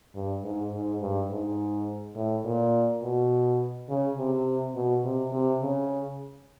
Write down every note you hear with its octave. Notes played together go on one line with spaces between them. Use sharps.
G2
G#2
G#2
G2
G#2
A2
A#2
B2
C#3
C3
B2
C3
C3
C#3